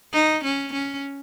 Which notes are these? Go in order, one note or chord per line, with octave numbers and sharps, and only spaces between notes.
D#4
C#4
C#4